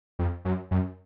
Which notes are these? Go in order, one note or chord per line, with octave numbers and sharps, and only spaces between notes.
F2
F#2
F#2